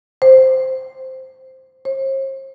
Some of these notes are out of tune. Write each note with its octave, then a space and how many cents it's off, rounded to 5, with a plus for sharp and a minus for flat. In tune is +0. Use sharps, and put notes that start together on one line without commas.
C5 +0
C5 +40